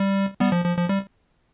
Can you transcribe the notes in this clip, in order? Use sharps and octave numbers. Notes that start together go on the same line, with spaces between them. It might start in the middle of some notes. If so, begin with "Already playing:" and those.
Already playing: G3
G3 B3
F3
F3
F3
G3